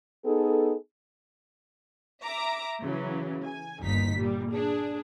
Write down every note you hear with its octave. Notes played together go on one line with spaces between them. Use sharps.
B3 D#4 G#4 A4
E5 A#5 D6
C#3 E3 F#3
G#5
G1 D#2 D#4 B6
A#2 G3
D4 G#4